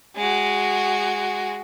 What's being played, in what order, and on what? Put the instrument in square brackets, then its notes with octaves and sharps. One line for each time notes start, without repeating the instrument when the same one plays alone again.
[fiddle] G#3 F#4